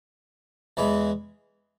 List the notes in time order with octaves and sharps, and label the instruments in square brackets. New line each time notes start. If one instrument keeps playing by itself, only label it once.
[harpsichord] E2 E3 G#3